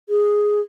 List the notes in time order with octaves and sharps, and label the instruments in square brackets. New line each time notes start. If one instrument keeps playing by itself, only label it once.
[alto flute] G#4